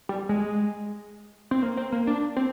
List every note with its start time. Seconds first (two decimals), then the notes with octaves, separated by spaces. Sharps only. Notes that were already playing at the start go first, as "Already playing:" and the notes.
0.09 G3
0.29 G#3
1.51 C4
1.63 A#3
1.77 C4
1.92 A#3
2.07 D4
2.37 C4